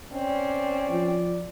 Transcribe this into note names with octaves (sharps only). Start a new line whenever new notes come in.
C4 C#4 D5
F3